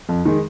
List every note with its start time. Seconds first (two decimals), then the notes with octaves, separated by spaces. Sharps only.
0.09 F2
0.25 D#3 G#3